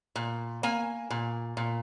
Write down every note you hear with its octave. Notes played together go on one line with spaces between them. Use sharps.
A#2
A#3 G#5
A#2
A#2